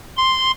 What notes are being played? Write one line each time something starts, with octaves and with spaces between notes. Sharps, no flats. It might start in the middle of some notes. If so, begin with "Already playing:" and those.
C6